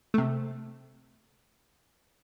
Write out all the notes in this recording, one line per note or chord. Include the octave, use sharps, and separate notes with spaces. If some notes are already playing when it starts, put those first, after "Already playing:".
C3 A3